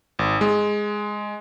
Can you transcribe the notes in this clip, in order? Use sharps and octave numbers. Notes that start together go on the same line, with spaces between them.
G#1
G#3